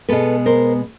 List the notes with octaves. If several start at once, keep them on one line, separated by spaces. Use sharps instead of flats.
B2 G#3 B3 A4 B4
A#4 C5